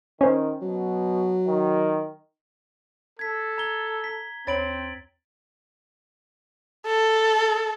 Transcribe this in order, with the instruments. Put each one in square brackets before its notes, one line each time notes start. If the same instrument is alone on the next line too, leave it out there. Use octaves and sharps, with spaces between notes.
[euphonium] D#3 [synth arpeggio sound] C#4 C5
[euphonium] B2 [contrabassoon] F#3
[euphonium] D#3
[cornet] A4 [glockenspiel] G#6 B6
[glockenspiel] A#5 G#6 G7
B6
[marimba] D#2 C#5 B5 [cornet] C4 [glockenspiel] A6 D7 F#7
[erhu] A4